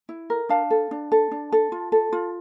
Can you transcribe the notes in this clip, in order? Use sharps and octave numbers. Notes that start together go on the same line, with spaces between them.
E4
A#4
D4 F5 A5
A4
D4
A4
D4
A4
F4
A4
F4